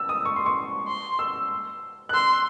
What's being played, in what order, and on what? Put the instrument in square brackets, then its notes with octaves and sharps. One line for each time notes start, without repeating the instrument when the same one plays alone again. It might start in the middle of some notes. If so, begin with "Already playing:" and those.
Already playing: [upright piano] E6
D#6
C#6
C6
C#6
[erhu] C6
[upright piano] E6
F#6
[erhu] C6 [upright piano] E6